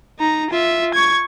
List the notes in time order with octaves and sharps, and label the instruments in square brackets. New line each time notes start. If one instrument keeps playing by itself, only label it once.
[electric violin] D#4 A#5
F4 E5
C#6 G#6